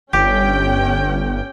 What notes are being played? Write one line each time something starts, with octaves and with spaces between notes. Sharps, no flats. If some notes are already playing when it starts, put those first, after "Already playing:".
G1 C#4 G4 G5